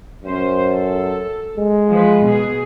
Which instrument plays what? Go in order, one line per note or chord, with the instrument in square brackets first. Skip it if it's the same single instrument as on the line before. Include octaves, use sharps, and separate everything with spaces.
[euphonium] F#2 [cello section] C#4 C5
[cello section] A4
[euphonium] G#3
[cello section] F3 G#4 B4
B2 B3 G#4